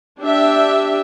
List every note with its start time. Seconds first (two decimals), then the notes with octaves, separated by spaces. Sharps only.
0.21 D4 G4 E5